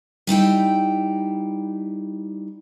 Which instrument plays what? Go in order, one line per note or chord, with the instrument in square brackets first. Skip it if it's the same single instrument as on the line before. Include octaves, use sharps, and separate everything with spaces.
[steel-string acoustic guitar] G3 D#4 E4 G5